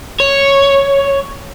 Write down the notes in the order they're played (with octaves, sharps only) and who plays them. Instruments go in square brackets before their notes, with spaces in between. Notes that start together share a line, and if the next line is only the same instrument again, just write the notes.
[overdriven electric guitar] C#5